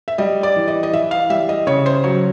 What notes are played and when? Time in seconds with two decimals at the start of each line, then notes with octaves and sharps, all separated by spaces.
0.08 E5
0.18 G3 D#5
0.43 D5
0.56 E3
0.68 D#5
0.83 D#5
0.93 E3 E5
1.11 F5
1.30 G3 E5
1.49 D#5
1.67 C#3 C#5
1.86 C5
2.04 F#3 C#5